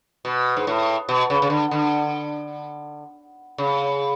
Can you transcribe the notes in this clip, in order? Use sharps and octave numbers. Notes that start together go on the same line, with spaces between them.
B2
G#2
A2
B2
C#3
C#3
D3
D3
C#3